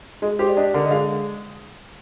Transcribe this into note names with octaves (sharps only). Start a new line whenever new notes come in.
G#3 D#5
G4 C5
D5
D4 D#5
D3 A#4
D#5
G#3 F5